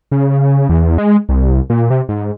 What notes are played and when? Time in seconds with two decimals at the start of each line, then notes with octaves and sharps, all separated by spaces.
0.12 C#3
0.69 E2
0.98 G#3
1.29 C2
1.70 A#2
1.90 C3
2.09 G#2